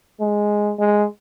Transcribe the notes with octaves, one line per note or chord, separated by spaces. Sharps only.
G#3
G#3